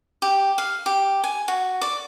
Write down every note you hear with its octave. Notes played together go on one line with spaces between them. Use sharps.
G4
F5
G4
G#5
F#4
D5